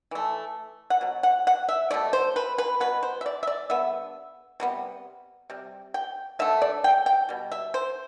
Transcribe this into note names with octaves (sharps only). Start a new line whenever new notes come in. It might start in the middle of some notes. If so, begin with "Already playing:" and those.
E3 A3
F#5
B2 F#3
F#5
F#5
E5
B2 A3 D5
C5
B4
B4
B2 F#3 B3 B4
C5
E5
D5
E5
D5
D3 G3 B3 E5
C3 G3 B3
C3 G3
G5
D3 A3 E5
D5
G5
G5
B2 G3
E5
C5